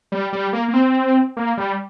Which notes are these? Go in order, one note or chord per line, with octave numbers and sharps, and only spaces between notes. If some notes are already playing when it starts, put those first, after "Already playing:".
G3
G3
A#3
A#3
C4
A#3
G3